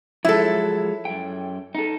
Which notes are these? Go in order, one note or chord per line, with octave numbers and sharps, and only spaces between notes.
F3 F#3 G#3 E4 A4
F#2 G5
D#4 A4